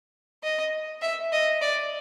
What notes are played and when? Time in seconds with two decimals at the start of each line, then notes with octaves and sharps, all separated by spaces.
0.43 D#5
1.02 E5
1.33 D#5
1.61 D5